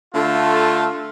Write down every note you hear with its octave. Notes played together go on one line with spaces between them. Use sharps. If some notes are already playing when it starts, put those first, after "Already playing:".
D3 A3 F4